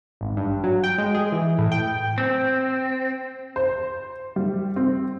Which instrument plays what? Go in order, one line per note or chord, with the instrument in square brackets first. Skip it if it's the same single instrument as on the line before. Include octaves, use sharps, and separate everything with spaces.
[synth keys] G#1
G2
F#3
G5
G#3
G#4
E3
A2
G5
[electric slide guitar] C4
[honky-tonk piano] C5
G3
C4